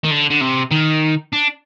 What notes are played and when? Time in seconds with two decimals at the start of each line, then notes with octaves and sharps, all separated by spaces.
0.04 D#3
0.10 D3
0.30 D3
0.41 C3
0.71 D#3
1.33 D4